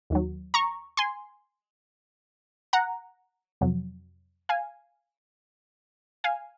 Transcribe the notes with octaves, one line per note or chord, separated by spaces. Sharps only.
D#2 D#3 F#3
A#5 C#6
G#5 C6
F#5 A#5
F2 C3 F#3
F5 G#5
F5 G#5